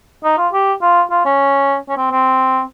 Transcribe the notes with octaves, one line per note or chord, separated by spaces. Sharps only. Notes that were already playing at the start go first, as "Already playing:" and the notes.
D#4
F4
G4
F4
F4
C#4
C#4
C4
C4